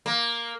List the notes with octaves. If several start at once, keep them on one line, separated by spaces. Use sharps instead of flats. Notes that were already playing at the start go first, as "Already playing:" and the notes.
A#3